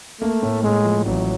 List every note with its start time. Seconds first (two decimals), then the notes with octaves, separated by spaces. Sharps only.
0.21 A3 A#3
0.43 A2
0.63 A2 G#3
0.84 F3
1.05 A1 F#3